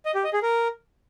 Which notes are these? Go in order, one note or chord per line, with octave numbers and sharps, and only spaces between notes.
D#5
G4
D#5
G#4
A#4